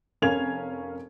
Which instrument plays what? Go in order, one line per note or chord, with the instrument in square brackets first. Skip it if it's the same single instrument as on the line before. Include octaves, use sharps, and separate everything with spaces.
[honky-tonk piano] F1 C#4 A#4 F5 G#6 F7